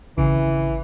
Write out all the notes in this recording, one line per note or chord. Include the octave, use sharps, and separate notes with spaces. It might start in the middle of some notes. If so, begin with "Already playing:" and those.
G#1 C#3 E3